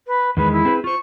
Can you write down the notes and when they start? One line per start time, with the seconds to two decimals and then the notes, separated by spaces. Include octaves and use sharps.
0.06 B4
0.37 E2 D#3 G#3 B4
0.51 E4
0.65 C4 G#4 B4
0.84 F4 C5 C#6